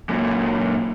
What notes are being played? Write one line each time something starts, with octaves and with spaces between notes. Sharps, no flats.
F#2 A#2